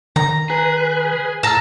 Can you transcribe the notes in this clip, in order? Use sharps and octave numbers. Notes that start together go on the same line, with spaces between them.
D#3 A#5
G#4 B4
A2 A5 A#5 E6 F6